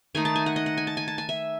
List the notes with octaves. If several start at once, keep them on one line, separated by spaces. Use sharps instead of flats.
D#3 A3 D#4 G#5
A5
G#5
F#5
D#5
F#5
G#5
A5
G#5
A5
G#5
E5